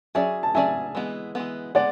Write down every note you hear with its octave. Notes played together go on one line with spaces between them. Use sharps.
F#3 C#4 G#4 D5 E5 G#5
A5
F#3 C#4 G#4 D5 E5 G#5
E3 G#3 B3
E3 G#3 B3
G#3 B3 D5 F#5